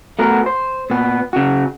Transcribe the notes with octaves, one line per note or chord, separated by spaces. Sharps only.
A3 B3 F#4 A#4
C5
A#2 B3
C#3 F#4